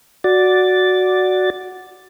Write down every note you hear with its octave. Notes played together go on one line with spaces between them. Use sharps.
F#4 D5 A6